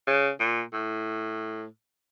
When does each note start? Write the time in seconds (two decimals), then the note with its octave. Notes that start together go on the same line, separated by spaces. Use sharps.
0.07 C#3
0.40 A#2
0.73 A2